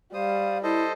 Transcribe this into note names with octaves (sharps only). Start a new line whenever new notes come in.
G3 C5 F5 D#6
E4 A4 C5 D#5